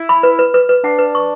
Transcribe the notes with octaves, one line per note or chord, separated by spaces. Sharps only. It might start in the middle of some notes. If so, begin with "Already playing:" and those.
Already playing: E4
B5
B4
B4
B4
B4
D4 F#5
B4
C#6